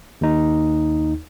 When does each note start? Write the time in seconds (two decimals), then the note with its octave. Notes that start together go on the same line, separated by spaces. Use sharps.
0.21 D#2 D#4